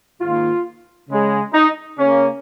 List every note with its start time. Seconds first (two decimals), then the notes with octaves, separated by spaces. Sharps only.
0.20 G#2 D#3 A#3 F4
1.08 C#3 G#3
1.53 D#4
1.98 C#3 A#3 C#4